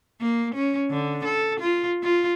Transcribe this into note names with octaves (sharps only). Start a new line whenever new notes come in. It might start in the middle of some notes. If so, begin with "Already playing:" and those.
A#3
C#4
D3
A4
F4
F4